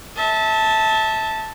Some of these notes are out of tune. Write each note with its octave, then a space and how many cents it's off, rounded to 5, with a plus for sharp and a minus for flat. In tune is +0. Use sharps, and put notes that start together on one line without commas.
E5 -30 A5 +0